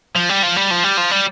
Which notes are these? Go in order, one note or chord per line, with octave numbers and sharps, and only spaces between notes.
F3
G3
F3
G3
F3
G3
F3
G3